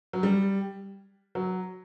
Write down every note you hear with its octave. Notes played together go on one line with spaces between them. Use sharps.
F#3
G3
F#3